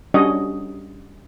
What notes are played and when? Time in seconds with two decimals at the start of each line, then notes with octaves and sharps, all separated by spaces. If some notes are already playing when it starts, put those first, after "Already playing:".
0.14 G3 C#4 D4 F#4 C#5 D#5